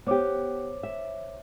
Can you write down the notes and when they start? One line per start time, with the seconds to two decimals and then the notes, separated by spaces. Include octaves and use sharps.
0.07 B3 G4 C5 C#5 D6
0.83 E5